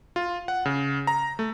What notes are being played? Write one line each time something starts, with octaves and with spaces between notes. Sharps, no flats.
F4
F#5
C#3
A#5
A3